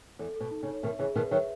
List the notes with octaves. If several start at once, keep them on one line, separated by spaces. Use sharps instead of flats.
E2 A4
B2 A4
D#4
C#3
C#5
B2 D#3 E5
C#3 E3 G#4
B2 D#3 B4
D#3 F#3 E5